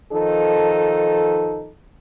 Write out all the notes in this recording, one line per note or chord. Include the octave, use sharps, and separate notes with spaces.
D#3 F3 D#4 A4